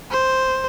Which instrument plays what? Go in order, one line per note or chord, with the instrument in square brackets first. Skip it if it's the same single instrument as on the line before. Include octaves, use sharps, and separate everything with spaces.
[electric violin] C5